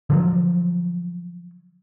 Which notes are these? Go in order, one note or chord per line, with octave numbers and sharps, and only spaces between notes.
D3 F3 F#3